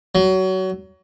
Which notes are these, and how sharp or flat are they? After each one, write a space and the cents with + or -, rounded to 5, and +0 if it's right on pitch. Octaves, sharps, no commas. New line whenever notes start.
F#3 +25